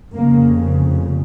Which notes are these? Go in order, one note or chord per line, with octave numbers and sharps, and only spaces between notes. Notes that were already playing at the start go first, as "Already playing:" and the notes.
F1 F2 C#3 A#3